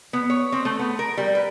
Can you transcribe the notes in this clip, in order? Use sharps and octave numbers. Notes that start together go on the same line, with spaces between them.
B3
C#5
C4
A3
B3
A#4
G3
B4